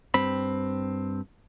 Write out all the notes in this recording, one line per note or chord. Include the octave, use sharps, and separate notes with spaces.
G2 C4 B5